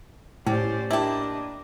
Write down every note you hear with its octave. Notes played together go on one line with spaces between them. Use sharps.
A2 C#4 G4 C5 D5
A#3 D4 E4 G4 D#5 A5